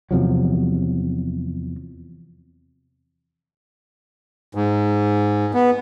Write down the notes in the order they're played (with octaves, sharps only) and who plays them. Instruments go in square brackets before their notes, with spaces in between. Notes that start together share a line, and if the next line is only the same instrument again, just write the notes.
[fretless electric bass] E2 C3 F3 F#3
[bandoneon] G#2
B3